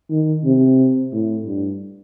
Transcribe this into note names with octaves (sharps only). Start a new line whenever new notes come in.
D#3
C3
A2
G2